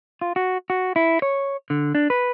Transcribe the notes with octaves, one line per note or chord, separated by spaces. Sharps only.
F4
F#4
F#4
E4
C#5
D3
D4
B4